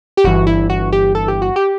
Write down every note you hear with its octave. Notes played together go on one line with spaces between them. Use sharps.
G4
G1 G2 E3 F#4
E4
F#4
G4
A4
G4
F#4
G4